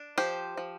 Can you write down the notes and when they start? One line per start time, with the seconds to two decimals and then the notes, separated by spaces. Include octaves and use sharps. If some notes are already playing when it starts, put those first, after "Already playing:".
Already playing: D4
0.18 F3 G4 C5
0.57 F3